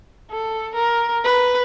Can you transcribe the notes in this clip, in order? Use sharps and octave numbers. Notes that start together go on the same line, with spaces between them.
A4
A#4
B4